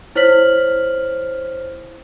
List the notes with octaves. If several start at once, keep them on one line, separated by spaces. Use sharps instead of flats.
E4 C5 C#5 F6 B6 F#7